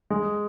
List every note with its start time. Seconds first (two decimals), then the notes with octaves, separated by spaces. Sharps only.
0.11 G#3